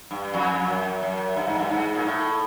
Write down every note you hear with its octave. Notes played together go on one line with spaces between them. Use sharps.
G2
F2
F#2
F#2
G2
G#2
G2
G#2
A#2
A2